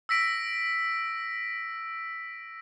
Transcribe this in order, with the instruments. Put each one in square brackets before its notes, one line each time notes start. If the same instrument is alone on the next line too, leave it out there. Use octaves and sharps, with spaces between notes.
[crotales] E6 A#6 B6 D7